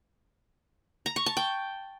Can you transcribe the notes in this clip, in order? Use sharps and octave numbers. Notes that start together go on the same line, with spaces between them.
A#5
C#6
A5
G5